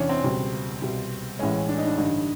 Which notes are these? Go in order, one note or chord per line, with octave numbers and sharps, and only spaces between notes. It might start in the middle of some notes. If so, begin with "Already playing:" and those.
Already playing: E2 C3 E3 C#4 D4
C4
C#2 B2 G3
C2 B2 G3
A1 A2 E3 G#3 C#4
D4
D#4
D4
A1 G2 D3 D#4